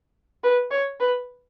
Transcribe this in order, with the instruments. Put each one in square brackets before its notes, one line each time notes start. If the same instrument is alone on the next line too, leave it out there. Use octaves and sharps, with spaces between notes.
[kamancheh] B4
C#5
B4